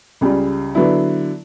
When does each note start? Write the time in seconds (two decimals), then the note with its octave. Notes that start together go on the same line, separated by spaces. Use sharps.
0.21 C#2 C#3 G3
0.75 D3 F#3 B3 E4